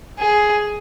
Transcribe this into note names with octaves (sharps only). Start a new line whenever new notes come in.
G#4